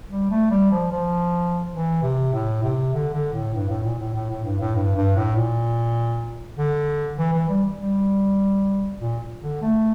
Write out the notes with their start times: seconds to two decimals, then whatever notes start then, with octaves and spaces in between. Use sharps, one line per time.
0.11 G3
0.30 A3
0.51 G3
0.71 F3
0.91 F3
1.73 E3
2.03 C3
2.33 A2
2.63 C3
2.94 D3
3.14 D3
3.33 A2
3.55 G2
3.70 A2
3.84 A#2
3.99 A2
4.15 A2
4.30 A2
4.45 G2
4.60 A2
4.76 G2
4.96 G2
5.16 A2
5.36 A#2
6.58 D3
7.19 E3
7.33 E3
7.49 G3
7.80 G3
9.01 A#2
9.41 D3
9.62 A3